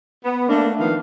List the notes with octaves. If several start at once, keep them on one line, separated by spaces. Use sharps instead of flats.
B3
A3 A#3 D4
D#3 F3 B3 F5